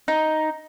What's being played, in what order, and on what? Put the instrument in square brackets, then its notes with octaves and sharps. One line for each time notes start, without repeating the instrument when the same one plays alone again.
[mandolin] D#4